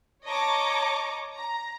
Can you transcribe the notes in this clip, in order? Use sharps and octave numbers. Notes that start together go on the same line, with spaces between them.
C#5 D#5 A5 A#5 C#6 D6
A#5